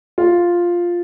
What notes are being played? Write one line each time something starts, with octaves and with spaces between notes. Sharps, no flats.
F4